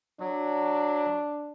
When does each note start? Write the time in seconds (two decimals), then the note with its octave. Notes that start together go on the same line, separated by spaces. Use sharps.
0.20 F#3 D4